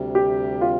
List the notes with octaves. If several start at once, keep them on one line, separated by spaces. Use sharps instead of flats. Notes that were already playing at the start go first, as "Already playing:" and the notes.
Already playing: D2 C3 G3
G4
F4